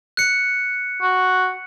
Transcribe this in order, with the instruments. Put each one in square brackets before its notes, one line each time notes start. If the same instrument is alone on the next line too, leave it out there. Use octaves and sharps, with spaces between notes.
[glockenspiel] F#6 C#7
[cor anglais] F#4